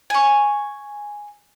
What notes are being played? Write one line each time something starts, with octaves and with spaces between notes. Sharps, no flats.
G#5 C#6